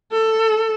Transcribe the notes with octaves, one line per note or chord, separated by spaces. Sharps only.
A4